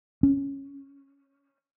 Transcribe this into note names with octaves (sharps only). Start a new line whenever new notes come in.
C#4